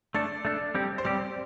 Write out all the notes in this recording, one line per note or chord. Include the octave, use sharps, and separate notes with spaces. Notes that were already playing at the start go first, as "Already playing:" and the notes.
A3 D4 A4 D5
A3 D4 A4
G3 C4 G4
C5
G3 C4 G4 D5